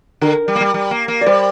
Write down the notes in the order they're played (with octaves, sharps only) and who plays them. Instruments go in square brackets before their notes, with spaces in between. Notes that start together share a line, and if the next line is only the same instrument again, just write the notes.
[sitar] D3 [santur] A#4
[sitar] G3
A#3
G3
G3
A#3
A#3
[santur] D5
[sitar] G3 [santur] C5